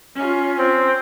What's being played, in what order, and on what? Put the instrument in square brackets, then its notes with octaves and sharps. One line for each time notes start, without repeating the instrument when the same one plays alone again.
[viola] C#4 F4
[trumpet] C4